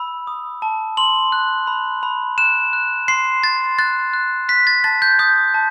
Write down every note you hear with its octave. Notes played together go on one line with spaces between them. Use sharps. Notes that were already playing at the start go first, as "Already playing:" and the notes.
Already playing: B5 E6
D#6
A5
C6 F#7
F#6
B5
B5
F#6 E7
F#6
C6 C7
C6 A6
F#6 A6
F#6
F#6 B6
A6
A5 A6
G6
D#6 G6
A5